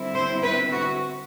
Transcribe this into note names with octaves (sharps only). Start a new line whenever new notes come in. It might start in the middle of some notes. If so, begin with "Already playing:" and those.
Already playing: D3 G3 C4 E4
C5
B4
F#4